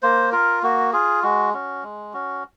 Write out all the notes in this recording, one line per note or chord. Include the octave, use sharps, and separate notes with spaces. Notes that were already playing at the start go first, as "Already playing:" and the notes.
A#3 C5
F4 A#4
A#3 F#4
F4 G#4
G#3 F#4
C#4 F#4
G#3
C#4 F#4